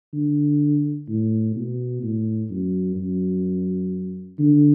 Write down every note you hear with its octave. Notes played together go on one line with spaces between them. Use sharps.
D3
A2
B2
A2
F#2
F#2
D3